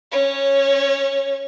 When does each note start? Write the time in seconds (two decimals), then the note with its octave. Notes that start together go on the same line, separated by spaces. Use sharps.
0.11 C#4 C#5